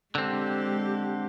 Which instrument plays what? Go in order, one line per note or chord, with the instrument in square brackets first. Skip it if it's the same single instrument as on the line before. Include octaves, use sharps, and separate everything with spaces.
[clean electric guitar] D3 C4 [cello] G#3 G4